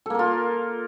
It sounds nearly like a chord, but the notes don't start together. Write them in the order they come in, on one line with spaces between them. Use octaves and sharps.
A4 A#3 A#4 F4